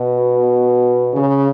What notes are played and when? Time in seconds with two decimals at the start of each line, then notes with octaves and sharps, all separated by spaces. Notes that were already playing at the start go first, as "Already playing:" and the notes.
Already playing: B2
1.14 C#3